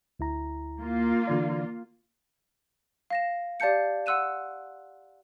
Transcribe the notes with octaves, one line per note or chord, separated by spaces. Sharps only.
D2 E4 A#5
A#3 F4
D3 E3 D5
F5 A#6 E7
G4 D5 F5 A5 G6 C#7
F#5 C6 E6 F#6 D#7 E7